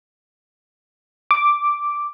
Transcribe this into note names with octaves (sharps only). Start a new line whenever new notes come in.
D6